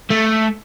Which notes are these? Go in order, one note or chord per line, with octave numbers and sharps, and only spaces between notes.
A3